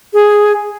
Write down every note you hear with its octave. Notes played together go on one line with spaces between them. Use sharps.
G#4